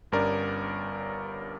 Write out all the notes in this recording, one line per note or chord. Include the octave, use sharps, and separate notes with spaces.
G1 G2 C#4 A#4 D5